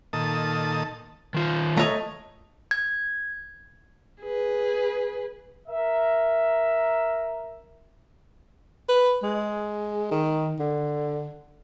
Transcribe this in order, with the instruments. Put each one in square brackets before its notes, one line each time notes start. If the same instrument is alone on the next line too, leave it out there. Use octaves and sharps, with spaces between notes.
[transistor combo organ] A#2 D#3 A4 A5 D#6
[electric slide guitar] D#3 F4
[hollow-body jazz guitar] A3 D#5 [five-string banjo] C#5 A#5
[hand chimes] G#6
[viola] G#4 B4
[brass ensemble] A#4 E5
[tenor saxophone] B4
G#3
D#3
D3